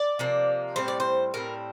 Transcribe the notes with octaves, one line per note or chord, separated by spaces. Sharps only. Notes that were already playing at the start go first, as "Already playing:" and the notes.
Already playing: D5
C3 F3 A#3
A2 G3 C4 C5
D5
C5
A2 G3 C4 A#4